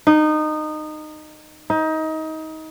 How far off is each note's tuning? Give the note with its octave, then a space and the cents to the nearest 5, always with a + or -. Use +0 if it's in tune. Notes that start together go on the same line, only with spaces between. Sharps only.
D#4 -20
D#4 +25